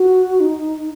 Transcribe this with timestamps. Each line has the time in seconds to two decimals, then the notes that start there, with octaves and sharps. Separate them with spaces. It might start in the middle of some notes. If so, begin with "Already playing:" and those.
Already playing: F#4
0.40 D#4